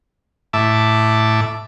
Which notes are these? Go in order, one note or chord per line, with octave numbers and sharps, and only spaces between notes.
A2 E5 A5 D6